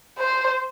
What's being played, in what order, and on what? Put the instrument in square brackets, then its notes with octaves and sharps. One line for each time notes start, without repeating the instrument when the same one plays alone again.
[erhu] C5